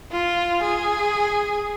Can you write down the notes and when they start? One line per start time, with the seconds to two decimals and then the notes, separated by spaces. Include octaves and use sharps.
0.12 F4
0.63 G#4